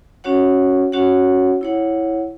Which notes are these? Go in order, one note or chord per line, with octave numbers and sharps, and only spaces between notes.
C#4 F#4 C#5 F#5
C#4 F#4 C#5 F#5
E4 C#5 F#5